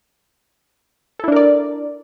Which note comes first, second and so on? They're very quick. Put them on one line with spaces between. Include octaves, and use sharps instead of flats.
A4 E4 D4 A#4 D5